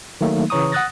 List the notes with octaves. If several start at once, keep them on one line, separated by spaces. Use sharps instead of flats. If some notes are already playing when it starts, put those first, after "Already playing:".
D#3 F#3 A3 A#3 D#4
C#3 E3 C#5 A#5 C#6 D#6
F#5 D#6 F#6 A6 A#6